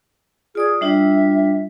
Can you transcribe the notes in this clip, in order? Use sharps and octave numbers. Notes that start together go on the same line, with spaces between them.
F4 G#4 D5 D#6
G3 D4 F4 E5